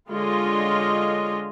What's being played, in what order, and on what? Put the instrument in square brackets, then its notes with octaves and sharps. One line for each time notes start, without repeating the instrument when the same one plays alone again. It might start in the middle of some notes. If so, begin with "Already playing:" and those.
[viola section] D3 G#3 F4 C#5 D#5